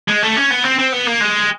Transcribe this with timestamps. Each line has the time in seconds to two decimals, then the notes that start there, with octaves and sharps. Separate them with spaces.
0.08 G#3
0.23 A3
0.36 C#4
0.50 B3
0.64 C4
0.79 C4
0.92 B3
1.07 A#3
1.21 G#3